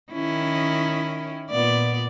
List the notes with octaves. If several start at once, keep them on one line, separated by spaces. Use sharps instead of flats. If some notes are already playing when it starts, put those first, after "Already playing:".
D#3 C#4 E4
A#2 B3 D5